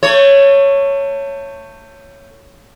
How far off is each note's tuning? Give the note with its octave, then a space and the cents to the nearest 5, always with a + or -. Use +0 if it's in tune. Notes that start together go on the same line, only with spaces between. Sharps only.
A3 +30 C#5 +0